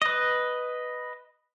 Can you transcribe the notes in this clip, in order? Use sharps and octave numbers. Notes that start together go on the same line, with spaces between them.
B4 D#5